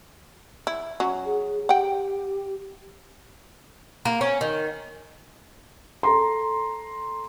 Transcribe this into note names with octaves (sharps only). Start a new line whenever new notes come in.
E4
F#3 C#4 F#4
G#4
G4 F#5 G5
A#3
C#4
D#3
A4 A#5 C6